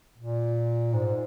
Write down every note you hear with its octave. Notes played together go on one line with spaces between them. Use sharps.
A#2
G#2